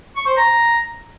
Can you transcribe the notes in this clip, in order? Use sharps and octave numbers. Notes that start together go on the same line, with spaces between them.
C#6
C5
A#5